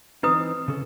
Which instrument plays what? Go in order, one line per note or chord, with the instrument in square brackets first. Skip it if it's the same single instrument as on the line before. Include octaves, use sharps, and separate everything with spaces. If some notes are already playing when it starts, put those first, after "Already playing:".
[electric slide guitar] E3 C4 D#4 [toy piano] E4 B4 D#6
[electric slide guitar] C#3 C#4 A4